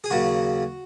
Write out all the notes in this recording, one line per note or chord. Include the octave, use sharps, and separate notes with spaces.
G#4
D#2 C#3 F#3 F#4